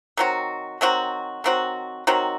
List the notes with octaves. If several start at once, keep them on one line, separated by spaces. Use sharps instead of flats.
D#3 F#3 C4 F#4
D#3 F#3 C4 F#4
D#3 F#3 C4 F#4
D#3 F#3 C4 F#4